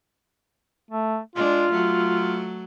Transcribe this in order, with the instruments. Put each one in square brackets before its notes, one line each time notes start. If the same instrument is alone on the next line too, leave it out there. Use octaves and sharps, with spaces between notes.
[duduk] A3
[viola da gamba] G#3 D4 [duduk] F4
[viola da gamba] F#3 A3